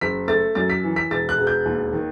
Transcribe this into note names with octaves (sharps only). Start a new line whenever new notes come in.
F#1 B6
A3 A6
F#2 A6
B6
E3
B6
E1 A6
F#6
E1
G6
D#2
D#3